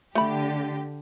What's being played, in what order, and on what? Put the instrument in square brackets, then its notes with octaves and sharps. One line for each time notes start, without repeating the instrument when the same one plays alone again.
[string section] D3 G4 [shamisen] A3 B5